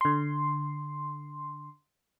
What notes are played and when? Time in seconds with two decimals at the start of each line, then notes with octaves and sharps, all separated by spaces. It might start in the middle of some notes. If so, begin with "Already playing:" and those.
0.01 D3 C6